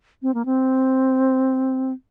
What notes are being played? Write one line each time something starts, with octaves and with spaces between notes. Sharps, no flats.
C4
A#3
C4